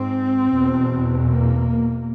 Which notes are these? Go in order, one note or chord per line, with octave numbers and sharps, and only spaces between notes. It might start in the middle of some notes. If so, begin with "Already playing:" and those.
Already playing: G#2 C4
E2 B2
A#3